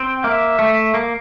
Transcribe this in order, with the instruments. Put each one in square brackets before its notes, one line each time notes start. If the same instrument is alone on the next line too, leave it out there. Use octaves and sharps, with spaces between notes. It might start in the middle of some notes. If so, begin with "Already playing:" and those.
Already playing: [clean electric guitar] C4 [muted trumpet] G5
[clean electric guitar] A#3 [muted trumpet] E5
[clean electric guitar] A3
A#3